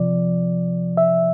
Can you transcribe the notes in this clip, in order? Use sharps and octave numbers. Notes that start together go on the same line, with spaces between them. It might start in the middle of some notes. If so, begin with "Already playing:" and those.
Already playing: C3 F3 D5
E5